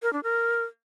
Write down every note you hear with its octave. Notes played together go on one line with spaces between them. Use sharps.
A#4
D4
A#4